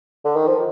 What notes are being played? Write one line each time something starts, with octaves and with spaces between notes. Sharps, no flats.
D3
D#3
F3